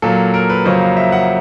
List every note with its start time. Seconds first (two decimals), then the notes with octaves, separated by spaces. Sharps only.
0.02 A#2 F#3 A#3 A4
0.34 A#4
0.49 B4
0.65 F2 C#3 F#3 A#3 C5
0.97 E5
1.12 F#5